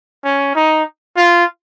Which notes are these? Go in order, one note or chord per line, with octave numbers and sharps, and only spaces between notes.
C#4
D#4
F4